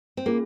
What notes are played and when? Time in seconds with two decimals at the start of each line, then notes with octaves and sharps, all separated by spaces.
0.17 C4
0.26 A#3 C#4 F4 G#4